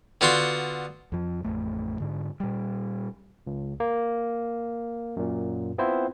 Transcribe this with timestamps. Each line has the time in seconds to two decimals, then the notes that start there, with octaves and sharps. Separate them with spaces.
0.21 D3 B3 F4 F#4 F#5 C6
1.12 F2 F3
1.44 A1 F2 A3
2.00 G#2 D3
2.40 A#2 G3
3.47 C#2
3.80 A#3
5.17 F#2 A#2
5.78 B3 C4 E4 F4 C5